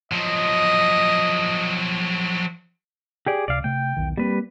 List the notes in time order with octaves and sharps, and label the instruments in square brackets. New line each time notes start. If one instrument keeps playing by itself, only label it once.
[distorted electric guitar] F3 F#3 [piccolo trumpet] D#5
[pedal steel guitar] G4 G#4 D5
[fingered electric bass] C#2 C3 [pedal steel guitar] D5 F5
[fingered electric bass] C3 A3 [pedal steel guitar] G5
[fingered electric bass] B1 E2 D#3
[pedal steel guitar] G3 B4 [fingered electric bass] A#3 C4